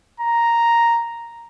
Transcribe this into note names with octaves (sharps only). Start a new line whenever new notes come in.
A#5